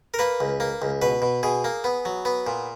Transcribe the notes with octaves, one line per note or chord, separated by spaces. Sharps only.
A#4
A#3 B4
C#2
A#3
C#2
B2 B4
B2
B2 G#4
A#3
B3
F#3
B3
A#2